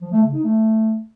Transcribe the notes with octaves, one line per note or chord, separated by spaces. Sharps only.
F3
A3
C#3
D#4
A3